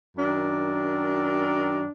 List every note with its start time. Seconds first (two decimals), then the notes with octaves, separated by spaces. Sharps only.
0.17 F#2 D#3 D4